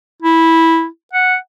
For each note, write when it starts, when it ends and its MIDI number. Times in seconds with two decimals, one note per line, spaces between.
0.22 0.86 64
1.13 1.36 78